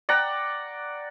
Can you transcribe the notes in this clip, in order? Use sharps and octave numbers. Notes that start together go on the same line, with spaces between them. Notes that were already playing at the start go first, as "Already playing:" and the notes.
D5 F#5 G5 A#5